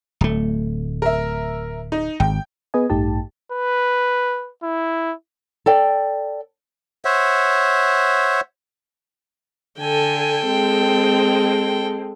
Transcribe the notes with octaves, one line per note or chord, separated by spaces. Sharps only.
D1 A3
A#4 E5
D#4
G#1 G5
B3 G#4 B4 D#5 G#5
A1 G2 A3 D#4 G4 A5
B4
E4
A4 D5 G5
C5 C#5 E5 F#5
D3 A4 G5 G#5
G#3 C4